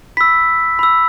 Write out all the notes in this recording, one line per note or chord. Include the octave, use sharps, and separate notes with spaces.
B5 E6 B6
B5 E6